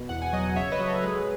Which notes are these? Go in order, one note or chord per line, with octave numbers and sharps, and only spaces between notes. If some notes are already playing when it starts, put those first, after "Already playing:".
Already playing: B2
E2 F#5
G#5
F#3 D#5 F#5
C#3 C#5 E5
B4 D#5
F#3
A4 C#5
G#3 G#4 B4